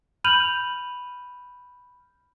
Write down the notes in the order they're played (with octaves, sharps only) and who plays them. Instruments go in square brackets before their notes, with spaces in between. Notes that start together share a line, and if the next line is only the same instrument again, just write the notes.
[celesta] B5 F6 G6 D#7 F7 F#7